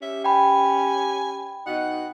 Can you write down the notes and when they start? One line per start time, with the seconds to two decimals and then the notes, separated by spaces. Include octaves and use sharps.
0.02 C#4 G4 E5
0.24 G5 G#5 B5
1.67 B2 D#4 F#5